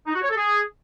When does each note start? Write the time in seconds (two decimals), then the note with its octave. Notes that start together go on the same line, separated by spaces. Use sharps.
0.07 D#4
0.14 F#4
0.22 C#5
0.29 A4
0.37 G#4